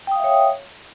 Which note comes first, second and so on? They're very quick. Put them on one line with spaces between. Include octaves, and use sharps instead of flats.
G5 D#6 F5 E5 C#5